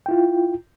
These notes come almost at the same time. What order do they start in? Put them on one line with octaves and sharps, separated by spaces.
G5 E4 F4